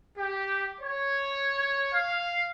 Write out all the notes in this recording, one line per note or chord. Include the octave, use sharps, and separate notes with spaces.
G4
C#5
F5